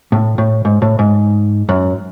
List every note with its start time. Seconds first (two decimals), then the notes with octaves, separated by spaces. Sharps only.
0.12 A2
0.38 A2
0.65 G#2
0.82 A2
0.99 G#2
1.69 F#2